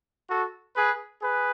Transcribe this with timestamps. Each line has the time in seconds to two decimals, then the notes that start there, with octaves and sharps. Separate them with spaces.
0.29 F#4 A4
0.75 G#4 B4
1.22 G#4 B4